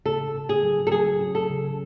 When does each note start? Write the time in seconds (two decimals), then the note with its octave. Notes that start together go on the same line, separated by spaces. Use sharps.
0.05 C#3 A4
0.34 C#3
0.49 G#4
0.63 F#3
0.87 A4
0.92 F#3 G#4
1.20 C#4
1.35 A4
1.50 C#3